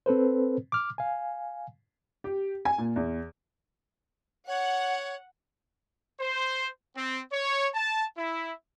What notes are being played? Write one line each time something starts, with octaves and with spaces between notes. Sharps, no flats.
C4 A4 B4 C5
D6 F6
F5 G#5
G4
G#5
A#2
E2
C#5 F#5
C5
C4
C#5
A5
E4